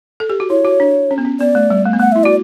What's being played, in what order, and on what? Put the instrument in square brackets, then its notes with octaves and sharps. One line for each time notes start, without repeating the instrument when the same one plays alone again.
[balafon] A4
G4
F#4
[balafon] E4 [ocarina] C#5
[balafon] F#4
D4
C#4
B3
C#4
[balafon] B3 [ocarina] D5
[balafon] A3
G3
A3
B3
[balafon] A3 [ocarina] F#5
[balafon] E4 [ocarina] E5
[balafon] F#4 [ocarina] D5